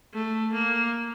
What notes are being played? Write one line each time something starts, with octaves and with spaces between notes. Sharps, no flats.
A3
A#3